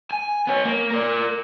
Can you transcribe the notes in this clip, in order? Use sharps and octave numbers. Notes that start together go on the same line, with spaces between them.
G#5
B3 C#5
A#3
A#4 D5